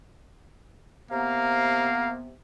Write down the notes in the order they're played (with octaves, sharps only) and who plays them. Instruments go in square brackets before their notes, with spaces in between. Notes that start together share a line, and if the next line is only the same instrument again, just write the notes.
[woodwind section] C3 B3 [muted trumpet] A#3 [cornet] F5 [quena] A#5